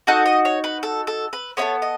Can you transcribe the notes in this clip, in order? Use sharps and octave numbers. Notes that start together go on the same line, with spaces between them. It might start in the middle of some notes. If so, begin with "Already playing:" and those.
D#4 F#4 A4 F#5
D#5
C#5
B4
A4
A4
B4
B3 E4 A4 C#5
D#5